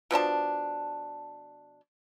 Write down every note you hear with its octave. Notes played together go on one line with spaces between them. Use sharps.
B2 F3 D4 A5